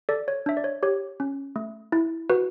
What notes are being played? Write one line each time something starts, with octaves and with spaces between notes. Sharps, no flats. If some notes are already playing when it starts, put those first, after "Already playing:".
A4 D5
C#5
D4 E5
D5
C#5
G4 C#5
C#4
A3
E4
F#4 B4